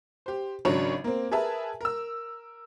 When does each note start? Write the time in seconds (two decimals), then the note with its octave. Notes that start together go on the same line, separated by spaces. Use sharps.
0.26 G4 C5
0.65 G#1 C#3 F#3 D4 C#5
1.04 A#3 C4
1.31 G#4 A#4 B4 E5 A5
1.81 A#4 E6